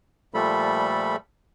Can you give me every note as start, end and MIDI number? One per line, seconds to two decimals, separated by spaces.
0.34 1.16 46
0.34 1.16 53
0.34 1.16 55
0.34 1.16 57
0.34 1.16 69
0.34 1.16 83